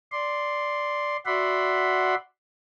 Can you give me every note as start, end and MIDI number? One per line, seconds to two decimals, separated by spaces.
0.12 1.17 74
0.12 1.17 84
1.26 2.15 66
1.26 2.15 74
1.26 2.15 76
1.26 2.15 78
1.26 2.15 83
1.26 2.15 84